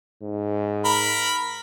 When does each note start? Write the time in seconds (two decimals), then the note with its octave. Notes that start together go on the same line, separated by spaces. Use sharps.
0.22 G#2
0.85 A#4 B5